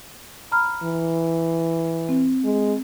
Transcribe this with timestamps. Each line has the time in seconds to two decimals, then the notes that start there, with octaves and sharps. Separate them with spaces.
0.52 A#5 B5 F6
0.83 E3
2.09 C4
2.44 G#3